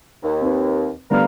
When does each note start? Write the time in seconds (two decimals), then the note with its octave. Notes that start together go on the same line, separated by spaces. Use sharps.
0.23 D#2
0.42 C4 D#4 B4
1.11 D3 G3 B3 A#4 F5